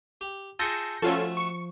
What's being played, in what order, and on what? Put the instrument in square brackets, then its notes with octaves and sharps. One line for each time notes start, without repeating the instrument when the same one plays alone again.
[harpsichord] G4
[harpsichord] F4 G#4 [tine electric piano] A5 E6 [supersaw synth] G6 A#6 C#7
[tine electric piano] F3 [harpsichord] A3 F#4 [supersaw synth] C#4 F4 A4
[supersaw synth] C#6